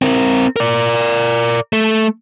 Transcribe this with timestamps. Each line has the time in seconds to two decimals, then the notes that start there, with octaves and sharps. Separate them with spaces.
0.02 C4 A#4
0.56 A#4 D5
1.73 A3